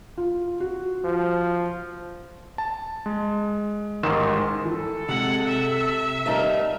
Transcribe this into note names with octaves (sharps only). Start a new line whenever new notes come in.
F4
F#4
F3
A5
G#3
A1 G#2 D#3 C6 E7
E3 A4
C3 G#3 F#5
E5
D#3 G3 A3 D#4 A#4 F5